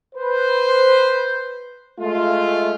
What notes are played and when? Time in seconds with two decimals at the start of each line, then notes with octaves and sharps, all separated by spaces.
0.15 B4 C5
1.98 G#3 A3 F4